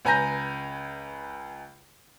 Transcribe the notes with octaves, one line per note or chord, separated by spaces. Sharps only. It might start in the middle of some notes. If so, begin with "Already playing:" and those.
C#2 B4 G#5 A#5 G6 A#6